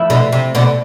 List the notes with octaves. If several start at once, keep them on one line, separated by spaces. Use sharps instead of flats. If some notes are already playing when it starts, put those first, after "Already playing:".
Already playing: F3 A3 E4
B2 D3
C3
B2 D3